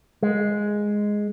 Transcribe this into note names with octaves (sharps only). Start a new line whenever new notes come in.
G#3